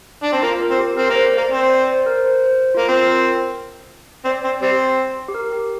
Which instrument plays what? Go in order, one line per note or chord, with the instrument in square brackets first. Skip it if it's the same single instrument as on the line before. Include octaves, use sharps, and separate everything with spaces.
[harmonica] D4
C4
[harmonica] A#3 [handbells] F4
[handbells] A#4
[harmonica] C4
[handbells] G4
[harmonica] C4 [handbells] A#4
[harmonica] A#3
[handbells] C5
D5
[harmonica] A#3
[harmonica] C4 [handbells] C5
[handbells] D5
C5
C5
A#4
C5
C5
F4
[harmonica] A#3
[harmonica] C4 [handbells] F4
[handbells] A#4
[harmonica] C4 [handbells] D5
[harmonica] C4
G3 C4
[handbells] G4
A#4
G4